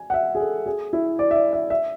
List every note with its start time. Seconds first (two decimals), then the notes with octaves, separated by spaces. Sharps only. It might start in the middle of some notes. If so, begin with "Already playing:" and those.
Already playing: G#5
0.10 F#5
0.14 E5
0.35 G#4
0.40 A4
0.66 G#4
0.93 E4
1.19 D5
1.31 E5
1.35 D5
1.53 E5
1.70 E5